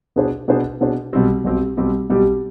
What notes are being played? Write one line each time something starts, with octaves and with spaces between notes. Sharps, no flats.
B2 B3 D4 G#4 C5
B2 B3 D4 G#4 C5
B2 B3 D4 G#4 C5
B1 B2 G3 C4 G4
B1 B2 G3 C4 G4
B1 B2 G3 C4 G4
B1 B2 G3 C4 G4